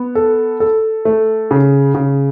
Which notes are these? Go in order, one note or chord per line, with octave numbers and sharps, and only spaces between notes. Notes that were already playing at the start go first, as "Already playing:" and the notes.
Already playing: B3
A4
A4
A3
C#3
C#3